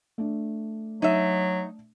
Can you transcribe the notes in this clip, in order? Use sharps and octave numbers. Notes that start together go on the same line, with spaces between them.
A3 D4
F#3 D#4 E5